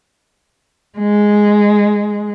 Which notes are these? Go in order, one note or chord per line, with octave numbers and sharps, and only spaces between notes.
G#3